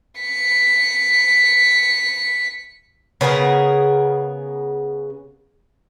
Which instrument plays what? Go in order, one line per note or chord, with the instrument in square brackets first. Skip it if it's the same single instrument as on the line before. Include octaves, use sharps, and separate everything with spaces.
[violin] B6 C#7
[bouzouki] C#3 B3 G#4 A#4